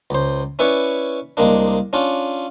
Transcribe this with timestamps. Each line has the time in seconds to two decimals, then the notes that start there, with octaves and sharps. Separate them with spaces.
0.10 C#2 C5
0.59 C#4 E4 B4 C#5 D5
1.37 C2 G#3 A#3 D4
1.93 C#4 D4 F4